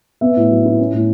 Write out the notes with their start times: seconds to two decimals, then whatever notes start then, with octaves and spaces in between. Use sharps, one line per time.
0.21 B3 E5
0.36 A2
0.51 F#3
0.65 E4
0.79 C#4
0.93 A2